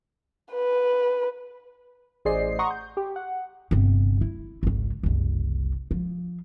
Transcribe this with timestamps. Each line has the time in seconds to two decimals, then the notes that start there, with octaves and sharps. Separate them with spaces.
0.53 B4
2.25 A1 G#4 C5 D5 D#5 C7
2.59 F#5 A#5 C6 C#6 D#6
2.70 G6
2.97 G4
3.16 F#5
3.71 G1 C3
4.21 E4
4.63 G#1 C#2
5.03 F#1 C2
5.91 F3